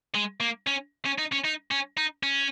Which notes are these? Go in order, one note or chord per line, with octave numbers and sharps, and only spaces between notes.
G#3
A#3
C#4
C#4
D#4
C#4
D#4
C#4
D#4
C#4